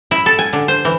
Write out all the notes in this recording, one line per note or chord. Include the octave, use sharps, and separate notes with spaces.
E4
A4
G#5
D3
C5
E3